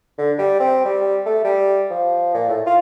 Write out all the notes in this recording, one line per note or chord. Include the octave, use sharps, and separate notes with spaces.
D3
G3
C4
G3
A3
G3
F3
A#2
A2
F4